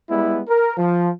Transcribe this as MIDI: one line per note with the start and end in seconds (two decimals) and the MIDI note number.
0.10 0.40 55
0.10 0.40 56
0.10 0.40 59
0.10 0.40 64
0.48 0.77 70
0.78 1.09 53